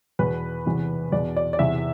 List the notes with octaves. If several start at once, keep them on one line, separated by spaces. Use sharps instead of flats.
E2 B2 B4
E2 C3 E3
E2 B2 D5
D5
D5
E2 C3 E3 E5